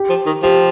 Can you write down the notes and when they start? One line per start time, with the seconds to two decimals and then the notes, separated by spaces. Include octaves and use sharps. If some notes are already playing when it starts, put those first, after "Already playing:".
Already playing: G4
0.09 F3
0.26 D#3
0.43 F3 G4